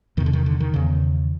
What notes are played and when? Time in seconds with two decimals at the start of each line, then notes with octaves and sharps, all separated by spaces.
0.17 E2 D#3
0.20 C3
0.26 D3
0.33 D#3
0.46 D3
0.60 D#3
0.74 E2 C#3